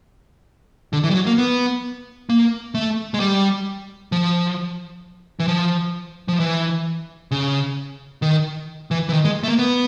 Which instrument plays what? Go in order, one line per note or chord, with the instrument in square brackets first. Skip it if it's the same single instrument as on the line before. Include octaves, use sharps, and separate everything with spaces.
[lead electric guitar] D3
E3
G3
F#3
A#3
B3
A#3
A3
G#3
G3
F3
E3
F3
F3
E3
C#3
D#3
E3
E3
D#3
G#3
A3
A#3
B3